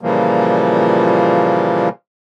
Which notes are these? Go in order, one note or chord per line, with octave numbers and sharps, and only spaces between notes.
A#2 C#3 E3 F3 G3 A#3